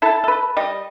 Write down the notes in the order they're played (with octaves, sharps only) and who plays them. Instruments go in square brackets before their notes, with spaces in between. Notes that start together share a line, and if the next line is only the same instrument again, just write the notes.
[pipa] E4 A4 A5
A4 B4
G3 D#5